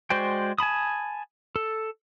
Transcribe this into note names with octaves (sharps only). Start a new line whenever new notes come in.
G#3 F#4 C5 D5 G5
G#5 A5 B5 D#6
A4